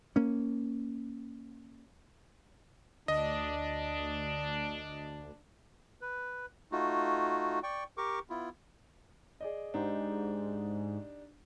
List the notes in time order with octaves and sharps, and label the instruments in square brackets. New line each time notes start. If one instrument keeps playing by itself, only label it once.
[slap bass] A#3 C#4
[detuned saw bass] D2 [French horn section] D4 [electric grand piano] D#5
[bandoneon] B4
A3 D#4 F4 F#4
D5 G5 C#6
G4 A#4 C#6 D6
B3 E4 F4
[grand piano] G#4 D5 D#5
[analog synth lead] G#2 [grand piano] D4 D#4 G4